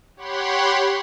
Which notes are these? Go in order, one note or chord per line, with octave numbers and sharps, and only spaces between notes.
G4 C#5 F#5 B5 C6